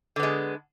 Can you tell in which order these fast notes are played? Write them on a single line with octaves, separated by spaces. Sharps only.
D3 B3 G#3